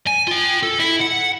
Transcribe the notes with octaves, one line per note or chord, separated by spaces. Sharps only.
G#5
F4 G5
A4
E4
F#5